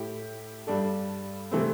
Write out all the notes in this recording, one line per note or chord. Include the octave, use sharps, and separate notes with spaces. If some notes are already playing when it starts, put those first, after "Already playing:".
Already playing: A2 A3 E4 G4
G2 G3 D4 A4
C3 E3 A3 C4